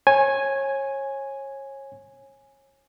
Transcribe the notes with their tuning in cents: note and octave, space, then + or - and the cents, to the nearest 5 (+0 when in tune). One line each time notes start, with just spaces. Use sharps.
C#5 -30 G#5 +0